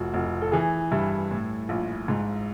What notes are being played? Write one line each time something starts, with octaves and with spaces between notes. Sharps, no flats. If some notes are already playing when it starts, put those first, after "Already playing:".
Already playing: F1 F#4
F1
A4
E3 G#4
G2 E4
A2
A#1
G#2